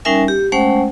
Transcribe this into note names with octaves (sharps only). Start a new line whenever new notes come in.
G3 C#4 D#4 A#4 E5 G#5
G4
G#3 A3 C#4 C5 F#5 G5